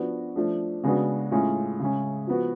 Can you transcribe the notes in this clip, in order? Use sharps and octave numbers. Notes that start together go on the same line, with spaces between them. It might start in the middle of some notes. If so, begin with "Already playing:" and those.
Already playing: F3 B3 D4 F#4
F3 A3 D4
C#3 G#3 B3 D4 F#4
A2 G#3 C#4 F4
C#3 G#3 C#4
F3 B3 F#4